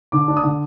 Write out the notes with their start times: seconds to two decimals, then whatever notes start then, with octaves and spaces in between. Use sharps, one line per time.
0.12 D3 D6
0.28 D4
0.37 D#6
0.43 D3